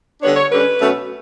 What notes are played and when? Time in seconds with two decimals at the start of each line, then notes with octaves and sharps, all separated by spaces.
0.22 D3 G3 B3 D4 C#5
0.36 C#5
0.51 D3 G3 C#4 B4
0.79 B2 F#3 A3 C#4